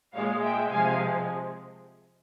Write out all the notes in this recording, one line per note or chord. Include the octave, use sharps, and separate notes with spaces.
A#2 G#3 C#5 F5
E5 G5
C3 F3 G#3 F5 G#5